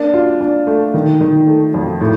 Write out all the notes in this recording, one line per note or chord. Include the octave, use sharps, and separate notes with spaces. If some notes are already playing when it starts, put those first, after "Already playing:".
Already playing: A#3 D4
F4
D4
A3
D#3
D#3
A3
F2
A2